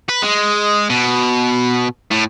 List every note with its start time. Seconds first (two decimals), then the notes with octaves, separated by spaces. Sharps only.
0.09 B4
0.23 G#3
0.90 B2
2.11 A2